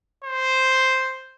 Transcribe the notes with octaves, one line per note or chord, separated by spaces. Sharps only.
C5